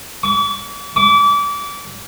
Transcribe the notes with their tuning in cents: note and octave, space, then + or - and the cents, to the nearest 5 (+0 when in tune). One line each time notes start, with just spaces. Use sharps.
D6 -45
D6 -30